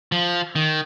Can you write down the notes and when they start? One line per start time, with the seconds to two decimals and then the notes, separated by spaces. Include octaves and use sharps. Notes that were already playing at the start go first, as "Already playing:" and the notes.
0.12 F3
0.56 D#3